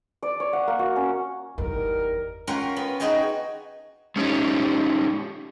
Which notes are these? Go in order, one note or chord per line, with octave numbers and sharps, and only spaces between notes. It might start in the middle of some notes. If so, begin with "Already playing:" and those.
D5
C#5
F#5
A#3
F#4
C#4
G1 E2 G3 D#4 A#4
C#4 F4 A#4 F#5 G5
B3
D#4 F#4 G#4 D#5 G5 G#5
G#3 C#4 D#4 G4 C#5